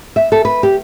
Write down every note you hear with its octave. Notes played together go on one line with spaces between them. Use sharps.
E5
A4
B4
G4